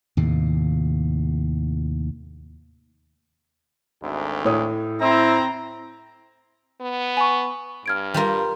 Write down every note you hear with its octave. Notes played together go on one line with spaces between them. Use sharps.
D#2 A2 C3
G#1 D2
A2 C#5 D#6
C4 E4 A#5
B3
G#5 B5 C#6
G2 F6 G#6 D7
G3 F4 A#4